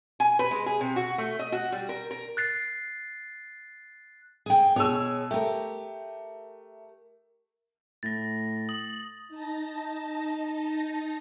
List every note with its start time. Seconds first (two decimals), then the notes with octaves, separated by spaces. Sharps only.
0.20 G#5
0.39 B4
0.51 G#3
0.66 G#4
0.81 C3
0.96 F#4
1.18 A3
1.39 D#5
1.52 F#4
1.72 G3
1.89 A#4
2.11 A#4
2.37 F#6 A6 C7
4.46 G#4 G5
4.76 B2 G#4 C#5 E6
5.31 A3 G4 A#4
8.03 A2 A6 A#6
8.69 D#6 F#7
9.28 D#4 A5 A#6